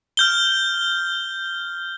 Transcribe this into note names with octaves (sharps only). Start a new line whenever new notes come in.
F6 G6 G7